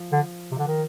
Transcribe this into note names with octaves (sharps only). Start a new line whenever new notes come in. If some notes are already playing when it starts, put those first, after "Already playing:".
Already playing: F3
D3
C3
D3
D#3